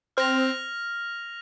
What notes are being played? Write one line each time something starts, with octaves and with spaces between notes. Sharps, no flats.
C4 F6 A#6 F7